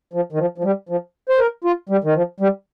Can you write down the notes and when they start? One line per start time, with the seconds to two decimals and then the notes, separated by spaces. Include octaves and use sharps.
0.13 F3
0.32 D#3
0.38 F3
0.58 F3
0.64 G3
0.89 F3
1.29 C5
1.39 A#4
1.64 F4
1.89 G3
2.04 D#3
2.15 F3
2.40 G3